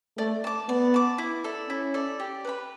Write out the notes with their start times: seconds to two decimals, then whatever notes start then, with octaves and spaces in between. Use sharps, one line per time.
0.18 A3 D5
0.44 A5 D6
0.69 B3 D5
0.94 A5 D6
1.18 E4
1.44 A4 D5
1.69 C#4 E4
1.94 A4 D5
2.20 G4
2.45 B4 F#5 B5